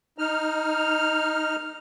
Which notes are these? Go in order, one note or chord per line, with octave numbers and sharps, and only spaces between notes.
D#4 F6